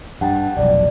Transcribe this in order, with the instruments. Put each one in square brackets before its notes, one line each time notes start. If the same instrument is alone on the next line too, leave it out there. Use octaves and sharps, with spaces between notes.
[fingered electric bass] G2 [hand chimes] F#5 G5 A5
[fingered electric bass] F1 B1 [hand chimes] D5